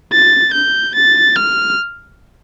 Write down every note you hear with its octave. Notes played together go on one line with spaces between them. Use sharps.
A6
G6
A6
F6